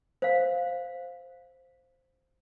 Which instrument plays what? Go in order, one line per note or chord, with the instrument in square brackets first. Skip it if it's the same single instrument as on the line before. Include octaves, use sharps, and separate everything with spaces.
[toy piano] C5 F5